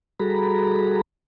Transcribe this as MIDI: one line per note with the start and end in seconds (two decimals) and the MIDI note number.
0.20 1.01 55
0.20 1.01 66
0.20 1.01 68
0.20 1.01 69
0.20 1.01 82
0.20 1.01 83